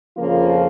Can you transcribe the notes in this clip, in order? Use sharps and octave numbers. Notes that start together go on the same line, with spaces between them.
F2 C#3 F3 A#3 F4